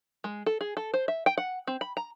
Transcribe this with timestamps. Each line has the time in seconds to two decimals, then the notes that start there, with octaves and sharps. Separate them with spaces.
0.24 G#3
0.46 A4
0.61 G#4
0.77 A4
0.94 C5
1.08 E5
1.26 G5
1.38 F#5
1.67 C4
1.81 B5
1.97 A#5